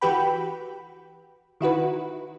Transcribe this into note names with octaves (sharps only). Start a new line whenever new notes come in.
E3 F#4 G4 B4 G5 B5
D#3 E4 F#4 B4